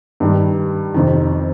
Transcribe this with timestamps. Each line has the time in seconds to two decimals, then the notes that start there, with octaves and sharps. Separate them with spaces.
0.20 G2 D#3 G3
0.94 F2 C3 D#3